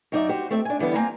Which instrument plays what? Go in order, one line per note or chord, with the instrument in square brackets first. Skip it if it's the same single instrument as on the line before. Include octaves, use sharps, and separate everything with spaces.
[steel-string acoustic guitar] F#2 D#4 D5 E5
F#4 G4 C5
A3 C4 E5
D4 G#5
D3 E3 G3 B3 E4
A#3 C4 G#5 A#5